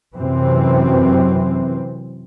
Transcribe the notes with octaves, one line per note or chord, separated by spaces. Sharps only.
F#2 C3 E3 C4